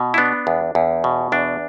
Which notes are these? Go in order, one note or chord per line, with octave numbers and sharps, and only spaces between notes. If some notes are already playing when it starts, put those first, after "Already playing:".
Already playing: B2
E4
B3 D4
E2
E2
B2
E2 D4